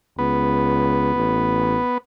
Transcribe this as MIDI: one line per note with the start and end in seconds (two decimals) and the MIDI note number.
0.19 1.12 37
0.19 1.98 59
1.16 1.78 33